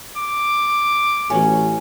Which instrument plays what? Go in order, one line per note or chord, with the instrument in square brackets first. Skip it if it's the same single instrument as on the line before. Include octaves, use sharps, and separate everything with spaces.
[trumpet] D6
[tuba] A1 [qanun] F#3 C#4